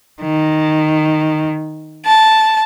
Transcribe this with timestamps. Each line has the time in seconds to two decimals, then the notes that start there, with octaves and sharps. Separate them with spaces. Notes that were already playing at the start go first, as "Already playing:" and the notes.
0.24 D#3
2.04 A5